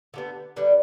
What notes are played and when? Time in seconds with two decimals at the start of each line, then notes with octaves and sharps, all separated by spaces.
0.14 D3 G3 B3
0.56 D3 G3 B3